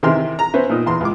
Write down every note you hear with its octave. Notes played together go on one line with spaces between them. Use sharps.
C3 D#3 E3 E5 C6 F6
A#5
B3 C#4 B4 C5 E5
A#2 B3 D#4
E2 C6
C#2 D6